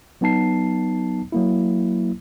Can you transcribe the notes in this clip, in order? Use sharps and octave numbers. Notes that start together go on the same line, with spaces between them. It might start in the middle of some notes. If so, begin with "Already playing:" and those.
F#3 B3 D#4 A5 C7
F#3 A#3 E4